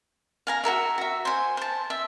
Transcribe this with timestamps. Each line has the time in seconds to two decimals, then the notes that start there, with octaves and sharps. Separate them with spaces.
0.47 F5 G#5 A#5
0.64 F#4 A4 A#4 E5
0.98 F#4 E5
1.25 C5 G#5
1.57 C5 A5
1.90 E5